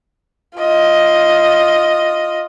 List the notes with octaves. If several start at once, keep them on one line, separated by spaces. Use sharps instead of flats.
F4 D#5